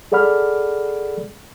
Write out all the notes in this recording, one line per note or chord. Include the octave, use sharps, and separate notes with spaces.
G#4 A4 D5 F#5 B5 F6